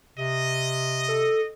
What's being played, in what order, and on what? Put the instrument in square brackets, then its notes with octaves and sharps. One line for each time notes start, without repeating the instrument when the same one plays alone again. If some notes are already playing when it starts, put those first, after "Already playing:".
[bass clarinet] C3 [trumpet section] D#5
[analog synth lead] A4